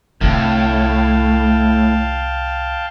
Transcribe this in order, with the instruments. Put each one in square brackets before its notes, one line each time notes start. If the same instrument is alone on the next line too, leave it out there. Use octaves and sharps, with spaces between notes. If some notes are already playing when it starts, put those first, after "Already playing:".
[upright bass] C2 D3 [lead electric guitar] A2 [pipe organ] F5 G5 A5